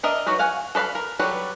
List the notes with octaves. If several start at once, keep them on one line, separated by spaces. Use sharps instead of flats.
D4 A#4 D#5 E5
F#3 D#4 F#4 B4
F5 F#5 G#5
A4 B4 D5 F5 B5
A#4
F#3 G3 A4 B4